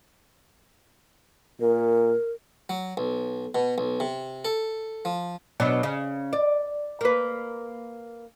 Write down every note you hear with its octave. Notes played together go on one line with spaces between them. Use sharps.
A#2 A#4
F#3
B1
B2
B1
C3
A4
F3
B2 F#3 D4
C#3
D5
A#3 B4